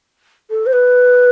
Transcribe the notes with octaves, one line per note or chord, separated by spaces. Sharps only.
A4
C5
B4